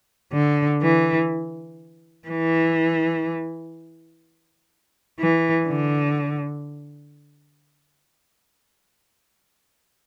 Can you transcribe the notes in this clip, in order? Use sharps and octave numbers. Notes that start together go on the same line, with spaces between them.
D3
E3
E3
E3
D3